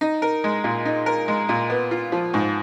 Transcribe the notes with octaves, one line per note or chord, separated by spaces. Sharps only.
D#4
A#4
G#3
A#2
D#4
A#4
G#3
A#2
B3
F4
F3
G#2